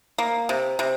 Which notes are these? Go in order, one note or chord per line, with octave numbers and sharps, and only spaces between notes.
A#3
C3
C3